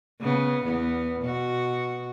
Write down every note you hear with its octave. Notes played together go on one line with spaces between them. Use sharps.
C#3 B3
E2 B3
B2 F#4